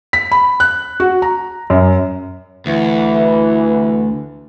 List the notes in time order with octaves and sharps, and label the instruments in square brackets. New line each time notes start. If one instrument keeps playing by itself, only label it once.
[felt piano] B6
B5
F#6
F#4
A#5
F#2
[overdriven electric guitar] D2 [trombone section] E3